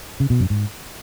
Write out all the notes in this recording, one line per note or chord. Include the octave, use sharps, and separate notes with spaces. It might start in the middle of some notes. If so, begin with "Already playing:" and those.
C#3
B2
F#2
G#2